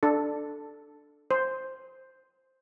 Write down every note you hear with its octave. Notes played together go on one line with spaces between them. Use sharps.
D4 A4
C5